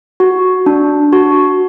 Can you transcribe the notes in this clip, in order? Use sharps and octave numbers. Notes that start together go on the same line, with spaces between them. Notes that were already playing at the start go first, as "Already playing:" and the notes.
F#4
D4
F#4